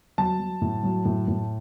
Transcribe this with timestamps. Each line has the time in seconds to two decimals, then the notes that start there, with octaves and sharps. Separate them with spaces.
0.18 F#3 A5
0.40 F#3
0.61 A2
0.83 F#3
1.05 A2
1.28 A2